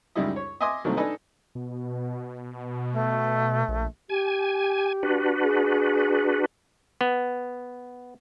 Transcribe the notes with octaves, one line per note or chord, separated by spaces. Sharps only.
C#2 F#2 G3 D#4 E4 D#5
C#5
D#5 E5 G#5 C6 D6 D#6
C2 D#3 F#3 A3 A#3 C4
D4 D#4 A4 B4 D#5 G#5
B2
A3
A#1
G4 G#5
D4 F#4 B4
G#4
B3